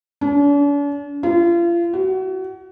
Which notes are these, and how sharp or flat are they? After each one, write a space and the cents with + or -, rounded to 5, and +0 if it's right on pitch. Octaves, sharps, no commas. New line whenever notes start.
D4 -45
F4 -35
F#4 +30